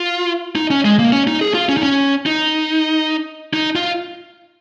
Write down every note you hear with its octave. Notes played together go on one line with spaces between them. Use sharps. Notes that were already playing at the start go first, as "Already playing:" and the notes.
Already playing: F4
D#4
C#4
G#3
A#3
C#4
D#4
G#4
F4
C#4
D#4
C#4
D#4
D#4
F4